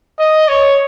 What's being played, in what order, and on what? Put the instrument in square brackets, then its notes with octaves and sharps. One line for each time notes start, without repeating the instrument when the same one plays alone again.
[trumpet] D#5
C#5